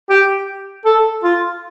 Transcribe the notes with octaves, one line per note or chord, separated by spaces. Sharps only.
G4
A4
F4